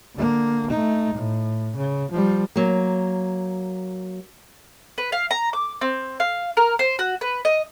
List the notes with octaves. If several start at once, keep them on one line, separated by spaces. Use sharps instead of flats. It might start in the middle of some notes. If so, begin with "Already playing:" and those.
D3 A#3
A3 D#4
A2
C#3
F3 G3
F#3 A#3
B4
F5
A#5
D6
C4
F5
A#4
C5
F#4
B4
D#5